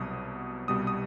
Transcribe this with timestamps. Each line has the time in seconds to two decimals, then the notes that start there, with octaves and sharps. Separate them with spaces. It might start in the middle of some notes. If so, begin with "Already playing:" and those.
Already playing: C2 B2 F#3 D#6
0.68 C2 B2 G3 D#6
0.87 D#6